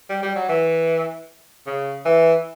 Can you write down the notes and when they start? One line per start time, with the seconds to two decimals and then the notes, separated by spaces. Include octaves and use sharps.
0.10 G3
0.23 G3
0.36 F#3
0.49 E3
1.67 C#3
2.06 E3